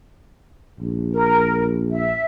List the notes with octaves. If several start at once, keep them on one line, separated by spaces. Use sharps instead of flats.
A#1
A#4
E5